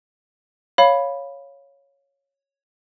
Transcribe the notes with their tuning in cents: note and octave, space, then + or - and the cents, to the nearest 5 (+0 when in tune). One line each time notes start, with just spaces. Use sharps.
C#5 +0 F5 +0 B5 +0